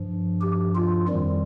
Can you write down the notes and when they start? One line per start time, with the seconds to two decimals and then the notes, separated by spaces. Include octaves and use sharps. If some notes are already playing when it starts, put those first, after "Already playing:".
Already playing: G2 F3
0.41 G4
0.75 F4
1.08 F2 D#3 G3